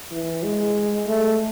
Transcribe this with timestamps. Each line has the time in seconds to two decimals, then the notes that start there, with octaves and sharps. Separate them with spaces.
0.11 E3
0.43 G#3
1.07 A3